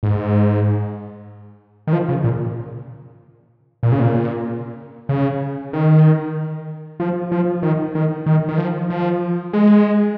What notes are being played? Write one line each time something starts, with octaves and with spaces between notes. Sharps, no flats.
G#2
D#3
F3
C#3
A#2
A#2
C#3
A#2
C#3
D#3
F3
F3
D#3
D#3
D#3
D#3
F3
F3
G#3